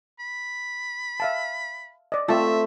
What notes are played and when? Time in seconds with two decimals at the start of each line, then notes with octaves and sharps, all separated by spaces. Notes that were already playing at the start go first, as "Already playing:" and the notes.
0.20 B5
1.20 E5 F5 A5
2.12 D5 D#5
2.28 A3 C4 F4 E5 A5